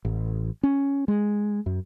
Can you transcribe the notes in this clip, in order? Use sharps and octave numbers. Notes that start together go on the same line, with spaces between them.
A1
C#4
G#3
F#2